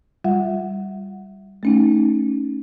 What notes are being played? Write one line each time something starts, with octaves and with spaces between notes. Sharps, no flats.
G3 F4 E5 F#5
A3 C#4 D#4